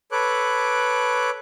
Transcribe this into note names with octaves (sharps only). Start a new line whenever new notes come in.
A4 B4 C#5 D6 F#6